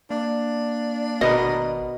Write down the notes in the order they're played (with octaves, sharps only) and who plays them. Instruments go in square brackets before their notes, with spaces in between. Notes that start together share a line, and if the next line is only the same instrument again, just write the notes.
[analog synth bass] A#3 [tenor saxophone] D4
[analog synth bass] G#1 [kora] B2 B3 A#4 [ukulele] D#5